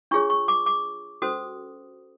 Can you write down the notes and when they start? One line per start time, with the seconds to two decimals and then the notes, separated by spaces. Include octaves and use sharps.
0.11 D4 F4 G#4 C#5 C#6
0.30 C#6
0.48 D6
0.66 D6
1.22 C#4 F#4 A4 C5 D#6